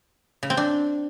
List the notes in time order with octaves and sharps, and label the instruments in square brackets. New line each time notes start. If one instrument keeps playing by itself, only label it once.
[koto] C#3
C4
D4